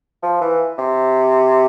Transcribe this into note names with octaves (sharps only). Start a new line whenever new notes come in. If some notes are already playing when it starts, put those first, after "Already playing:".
F3
E3
C3